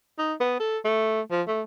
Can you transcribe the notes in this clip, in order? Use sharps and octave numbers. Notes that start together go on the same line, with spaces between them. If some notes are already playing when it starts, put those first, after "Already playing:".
D#4
B3
A4
A3
F3
A3